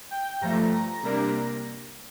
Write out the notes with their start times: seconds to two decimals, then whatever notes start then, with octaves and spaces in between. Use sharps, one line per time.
0.11 G5
0.41 G2 F3 A3 A#5
0.72 A#5
1.02 C3 G3 A#3 D4 A#5